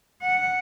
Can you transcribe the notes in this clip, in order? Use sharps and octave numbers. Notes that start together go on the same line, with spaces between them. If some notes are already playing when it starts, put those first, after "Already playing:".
F#5